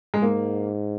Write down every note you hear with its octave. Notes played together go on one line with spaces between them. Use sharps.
G#3
G#2 A#3